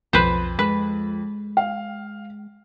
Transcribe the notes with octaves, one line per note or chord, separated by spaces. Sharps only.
B1 F2 B4 C5
G#3 B4
F5